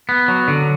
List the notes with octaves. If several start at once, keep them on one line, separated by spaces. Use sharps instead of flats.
B3
F#3
D3